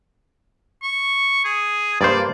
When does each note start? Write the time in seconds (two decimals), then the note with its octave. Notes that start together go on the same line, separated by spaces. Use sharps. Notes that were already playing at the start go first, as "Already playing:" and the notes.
0.83 C#6
1.45 G#4
2.01 G2 A#3 C5 D5